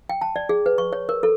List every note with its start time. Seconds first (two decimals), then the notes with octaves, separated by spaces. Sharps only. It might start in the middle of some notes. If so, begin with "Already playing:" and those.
0.09 G5
0.21 A5
0.36 D5
0.49 G#4
0.66 B4
0.78 C#6
0.93 C#5
1.09 A#4
1.23 A4